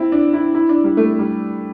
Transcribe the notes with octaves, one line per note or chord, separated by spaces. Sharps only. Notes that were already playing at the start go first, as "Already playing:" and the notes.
Already playing: C4 E4
D4
E4
E4
D4
G3
A3
G3